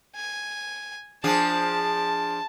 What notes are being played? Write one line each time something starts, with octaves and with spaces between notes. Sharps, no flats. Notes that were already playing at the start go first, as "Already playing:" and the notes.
G#5
F3 D4 G#4 A5